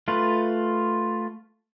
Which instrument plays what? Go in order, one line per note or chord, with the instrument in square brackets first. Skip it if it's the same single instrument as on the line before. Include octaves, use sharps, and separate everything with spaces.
[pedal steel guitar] A3 F4 B4